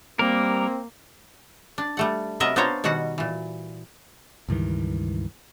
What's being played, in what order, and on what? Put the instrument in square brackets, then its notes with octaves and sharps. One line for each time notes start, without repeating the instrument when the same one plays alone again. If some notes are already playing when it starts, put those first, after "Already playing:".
[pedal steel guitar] G3 A#4 [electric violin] A#3 [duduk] C4
[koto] D4
G3 A3 F#5
C3 F#3 B3 A#4 D#5 E5
B3 D4 F4 C5 C#5 A#5
B2 D#3 G3 F#4 F#5
A#2 E3
[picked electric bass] C#2 G2 D#3 E3